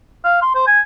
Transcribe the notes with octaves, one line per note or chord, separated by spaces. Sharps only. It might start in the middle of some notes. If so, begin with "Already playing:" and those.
F5
C6
C5
G#5